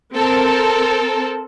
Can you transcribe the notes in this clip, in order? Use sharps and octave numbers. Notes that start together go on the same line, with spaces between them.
C4 A4 A#4